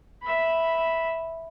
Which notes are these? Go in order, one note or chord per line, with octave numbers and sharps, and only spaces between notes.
E5 B5